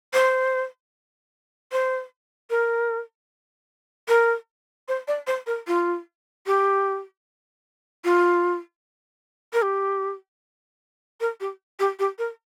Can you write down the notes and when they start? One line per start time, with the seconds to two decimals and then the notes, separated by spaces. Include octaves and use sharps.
0.13 C5
1.72 C5
2.50 A#4
4.08 A#4
4.88 C5
5.08 D5
5.27 C5
5.46 A#4
5.67 F4
6.46 G4
8.04 F4
9.53 A#4
9.62 G4
11.20 A#4
11.40 G4
11.79 G4
11.99 G4
12.18 A#4